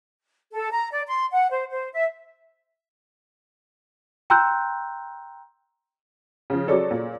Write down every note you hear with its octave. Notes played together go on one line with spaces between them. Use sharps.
A4
A#5
D5
C6
F#5
C5
C5
E5
G5 A#5 C6 E6 F#6 G6
C#3 F3
F#3 G#4 A4 C#5 D5
A#2